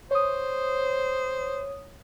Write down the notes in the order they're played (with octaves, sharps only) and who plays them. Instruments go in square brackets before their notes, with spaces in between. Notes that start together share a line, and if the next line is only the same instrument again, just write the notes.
[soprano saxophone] C5 [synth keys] C#5 D#6